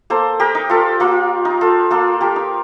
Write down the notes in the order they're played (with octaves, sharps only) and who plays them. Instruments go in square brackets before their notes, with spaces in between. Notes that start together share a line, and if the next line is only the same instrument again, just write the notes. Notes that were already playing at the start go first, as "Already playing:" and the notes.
[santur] A#3 A4 C5
G4 A#4
D#4
F4 A4
A#3 F4
D#4
F4 A4
A#3 F4 A4
G4 A#4
D#4